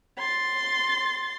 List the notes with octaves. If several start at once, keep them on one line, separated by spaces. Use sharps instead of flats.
C6 A6